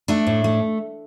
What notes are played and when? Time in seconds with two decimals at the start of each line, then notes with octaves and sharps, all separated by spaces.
0.08 A3 D4
0.27 A2
0.44 A3